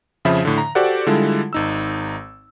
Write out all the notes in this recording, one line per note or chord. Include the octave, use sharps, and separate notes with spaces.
F2 C#3 F3 E5 B5
A2 D3
A#5
F#4 G4 A4 C5 D5 F#5
D3 G3 G#3 E4 F4 A4
G#1 D#4 E6